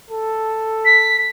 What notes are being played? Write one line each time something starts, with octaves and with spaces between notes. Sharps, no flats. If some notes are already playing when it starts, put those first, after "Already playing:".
A4
B6